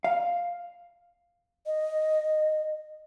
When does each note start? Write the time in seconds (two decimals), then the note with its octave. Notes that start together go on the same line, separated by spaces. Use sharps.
0.04 F5
1.67 D#5